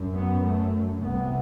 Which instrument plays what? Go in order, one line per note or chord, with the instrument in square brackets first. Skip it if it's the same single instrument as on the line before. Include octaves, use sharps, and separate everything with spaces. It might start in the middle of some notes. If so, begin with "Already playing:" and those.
Already playing: [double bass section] F#2
B3
A3
C2 C3 B3